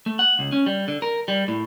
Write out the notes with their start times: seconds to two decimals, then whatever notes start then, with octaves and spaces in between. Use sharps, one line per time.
0.06 A3
0.19 F#5
0.39 C#2
0.52 C#4
0.66 G3
0.88 D3
1.02 A#4
1.28 G3
1.48 A2